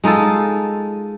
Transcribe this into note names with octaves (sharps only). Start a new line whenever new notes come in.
G#3 D#4 F4 A4